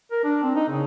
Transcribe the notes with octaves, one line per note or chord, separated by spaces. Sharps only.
A#4
D4
C4
D#4
C#3